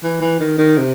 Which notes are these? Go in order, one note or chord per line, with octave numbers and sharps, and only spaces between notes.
E3
E3
D#3
D#3
C3